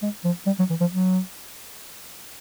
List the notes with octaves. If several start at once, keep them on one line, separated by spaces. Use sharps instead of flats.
G#3
F3
G3
F#3
E3
F3
F#3